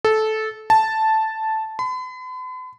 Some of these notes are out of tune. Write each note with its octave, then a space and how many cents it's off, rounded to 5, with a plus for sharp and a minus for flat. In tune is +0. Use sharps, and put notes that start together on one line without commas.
A4 -15
A5 -5
B5 +45